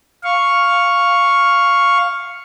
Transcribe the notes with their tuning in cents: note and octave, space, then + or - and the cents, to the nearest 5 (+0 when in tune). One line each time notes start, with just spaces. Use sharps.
F5 +0 C#6 +0